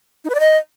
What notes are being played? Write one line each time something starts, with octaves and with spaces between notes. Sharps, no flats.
D#4
B4
D5
D#5